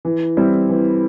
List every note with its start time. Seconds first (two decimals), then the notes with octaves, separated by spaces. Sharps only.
0.05 E3
0.37 G3 C4 E4
0.69 E3